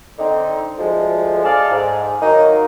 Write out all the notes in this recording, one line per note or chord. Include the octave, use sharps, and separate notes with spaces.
D3 C4 D#4
D2 F3 G#3
G#4 A4 D5 F5
G#2
D#3 F#3 A#3 D#4